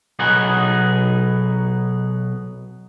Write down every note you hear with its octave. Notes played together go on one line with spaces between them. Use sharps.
B1 B2 B3 D#4 G#4 F#5